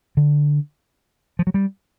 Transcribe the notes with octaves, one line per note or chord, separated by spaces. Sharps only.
D3
F3
F#3
G3